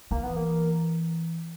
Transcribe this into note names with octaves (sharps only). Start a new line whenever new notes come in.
E3 A#3
B3
A#3